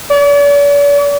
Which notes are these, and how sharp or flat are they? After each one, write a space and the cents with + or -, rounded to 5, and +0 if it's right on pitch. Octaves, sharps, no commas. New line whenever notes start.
D5 -45